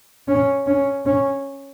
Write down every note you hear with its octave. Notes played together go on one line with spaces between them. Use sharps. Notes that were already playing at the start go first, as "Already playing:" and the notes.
C#4
C#4
C#4